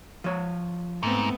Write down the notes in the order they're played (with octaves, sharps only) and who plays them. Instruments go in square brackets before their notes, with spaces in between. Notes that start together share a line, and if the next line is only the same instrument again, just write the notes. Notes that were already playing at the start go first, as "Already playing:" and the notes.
[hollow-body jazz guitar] F3 C#5
[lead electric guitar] G#2 [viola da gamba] A3 B3 C4